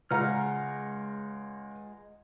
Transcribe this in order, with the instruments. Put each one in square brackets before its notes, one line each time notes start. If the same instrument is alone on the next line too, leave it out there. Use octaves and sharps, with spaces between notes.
[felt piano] C#2 F5 A#5 [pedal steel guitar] G#3 F#5 F6